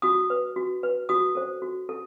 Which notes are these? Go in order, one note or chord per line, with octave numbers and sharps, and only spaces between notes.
F#4 D#6
B4
F#4
B4
F#4 D#6
A4 C5
F#4
A4